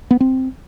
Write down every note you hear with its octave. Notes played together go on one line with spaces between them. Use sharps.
B3
C4